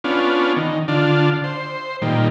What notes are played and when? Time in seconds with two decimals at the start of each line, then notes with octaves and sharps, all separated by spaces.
0.04 B3 C#4 D4 F4
0.57 D#3
0.88 D3 D4 F4
1.44 C5
2.02 A#2 D#3 G3